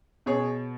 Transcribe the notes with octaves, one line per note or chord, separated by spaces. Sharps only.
B2 G#4 C#5